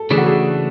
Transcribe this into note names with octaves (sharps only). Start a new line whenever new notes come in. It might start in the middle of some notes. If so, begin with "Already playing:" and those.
Already playing: A4
C#3 E3 A3 D4 G#4
F#4
G#4